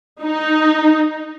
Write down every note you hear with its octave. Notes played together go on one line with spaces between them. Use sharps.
D#4